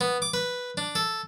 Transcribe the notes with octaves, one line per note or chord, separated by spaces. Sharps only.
B3
D6
B4
D4
A4